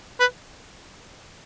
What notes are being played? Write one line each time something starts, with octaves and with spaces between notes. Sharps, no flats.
B4